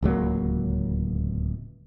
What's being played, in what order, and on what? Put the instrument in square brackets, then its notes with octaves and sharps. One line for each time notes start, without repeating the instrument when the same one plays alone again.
[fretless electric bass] D1 C#2 F#3 A#3